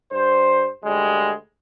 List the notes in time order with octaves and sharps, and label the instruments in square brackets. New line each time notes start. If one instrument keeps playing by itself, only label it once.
[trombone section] G2 C5
D2 G3 G#3